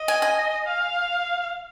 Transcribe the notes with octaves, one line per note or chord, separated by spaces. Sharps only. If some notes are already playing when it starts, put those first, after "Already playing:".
Already playing: D#5
G#5
G#5
F5